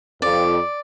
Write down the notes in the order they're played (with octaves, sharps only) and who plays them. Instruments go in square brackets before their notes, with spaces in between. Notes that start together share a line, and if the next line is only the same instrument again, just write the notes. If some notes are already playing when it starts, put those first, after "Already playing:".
[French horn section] F2 [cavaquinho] D5